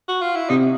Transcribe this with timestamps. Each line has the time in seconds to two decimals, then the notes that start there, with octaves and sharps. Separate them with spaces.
0.08 F#4
0.21 F4
0.35 E4
0.49 C3 D#4